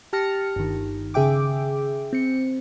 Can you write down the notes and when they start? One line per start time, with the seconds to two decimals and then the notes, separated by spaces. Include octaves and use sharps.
0.13 G4 A5 F6 A#6 C#7
0.56 G1 D#3
1.14 C#3 G#4 E5 G5 D6
2.13 C4 C#7